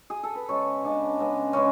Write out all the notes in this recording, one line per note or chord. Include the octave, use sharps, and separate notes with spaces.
G#4
A4
B4
C#3 G#3 B3 C#5
C#3 G#3 B3 D4
C#3 G#3 B3
C#3 G#3 B3 C#4